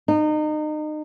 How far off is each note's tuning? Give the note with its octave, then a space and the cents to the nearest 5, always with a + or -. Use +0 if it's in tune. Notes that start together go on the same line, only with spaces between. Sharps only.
D#4 -30